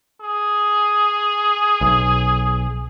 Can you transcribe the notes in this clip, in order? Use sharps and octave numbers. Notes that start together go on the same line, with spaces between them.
G#4
B1